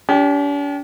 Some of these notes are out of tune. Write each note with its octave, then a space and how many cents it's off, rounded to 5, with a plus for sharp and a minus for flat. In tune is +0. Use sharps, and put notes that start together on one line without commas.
D4 -45 G4 +0